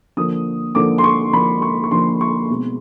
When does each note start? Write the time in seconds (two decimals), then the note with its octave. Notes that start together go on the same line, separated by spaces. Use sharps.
0.17 D3 F3 A#3 D#6
0.75 D3 F3 A#3 D6
0.98 C6
1.04 C#6
1.33 D3 F3 A#3 B5
1.62 C#6
1.84 C#6
1.91 D3 F3 A#3 C6
2.21 C#6
2.50 B2 G#3 C4